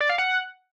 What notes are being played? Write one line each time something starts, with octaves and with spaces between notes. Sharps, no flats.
D5
F5
F#5